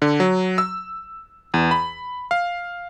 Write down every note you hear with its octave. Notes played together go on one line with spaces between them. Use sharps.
D3
F#3
E6
E2
B5
F5